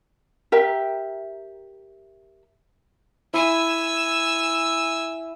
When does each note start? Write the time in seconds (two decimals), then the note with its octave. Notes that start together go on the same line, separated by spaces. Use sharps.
0.52 G4 A#4 E5 G5
3.34 E4 G#5 E6